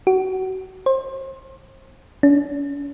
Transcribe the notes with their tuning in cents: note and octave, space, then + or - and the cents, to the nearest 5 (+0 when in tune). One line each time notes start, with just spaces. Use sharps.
F#4 +25
C5 +30
C#4 +45